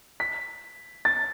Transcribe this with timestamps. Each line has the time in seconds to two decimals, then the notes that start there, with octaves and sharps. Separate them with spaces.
0.20 B6
1.05 A6